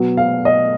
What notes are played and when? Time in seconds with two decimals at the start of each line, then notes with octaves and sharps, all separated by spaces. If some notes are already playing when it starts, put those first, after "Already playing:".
Already playing: B2 F#3 B3
0.17 F5
0.45 D#5